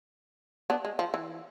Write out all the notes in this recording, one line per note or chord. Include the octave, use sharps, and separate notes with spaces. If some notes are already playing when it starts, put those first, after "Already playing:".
B3 D4
G#3
F3
E3